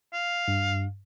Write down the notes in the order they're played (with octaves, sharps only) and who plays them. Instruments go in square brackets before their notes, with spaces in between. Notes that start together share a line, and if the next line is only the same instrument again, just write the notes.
[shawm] F5
[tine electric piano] G2